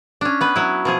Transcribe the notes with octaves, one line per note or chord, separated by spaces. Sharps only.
C#4 D4
B3 B4
F#3 E4
B2 F3 G#4